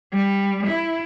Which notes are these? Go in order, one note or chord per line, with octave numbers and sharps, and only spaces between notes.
G3
E4